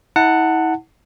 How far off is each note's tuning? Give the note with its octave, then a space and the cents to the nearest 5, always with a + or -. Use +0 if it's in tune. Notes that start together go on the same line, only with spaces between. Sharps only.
E4 -40 F#5 +0 A5 +25